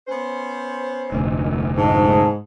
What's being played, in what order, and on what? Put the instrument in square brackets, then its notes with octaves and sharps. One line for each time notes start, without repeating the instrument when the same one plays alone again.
[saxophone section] B3 C#4 C5
[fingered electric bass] F1 D2
[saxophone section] G#2 [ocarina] A5